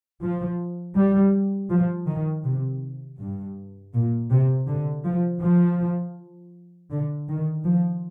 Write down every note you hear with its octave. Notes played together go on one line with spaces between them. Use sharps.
F3
G3
F3
D#3
C3
G2
A#2
C3
D3
F3
F3
D3
D#3
F3